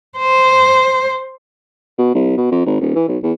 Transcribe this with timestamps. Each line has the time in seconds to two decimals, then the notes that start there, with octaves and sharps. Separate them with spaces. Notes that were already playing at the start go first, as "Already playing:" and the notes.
0.18 C5
1.98 B2
2.15 C2
2.37 B2
2.51 F2
2.66 G#1
2.80 D#1
2.95 E3
3.08 B1
3.23 E2